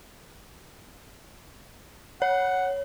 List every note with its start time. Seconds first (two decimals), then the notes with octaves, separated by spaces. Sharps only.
2.22 C#5 F#5